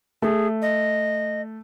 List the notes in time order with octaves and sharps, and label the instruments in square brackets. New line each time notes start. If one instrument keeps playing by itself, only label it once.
[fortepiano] A3 [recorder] G#4
[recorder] D#5